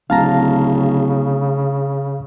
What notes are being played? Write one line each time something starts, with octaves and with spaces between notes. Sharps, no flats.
D1 C#3 F5 A5 A#5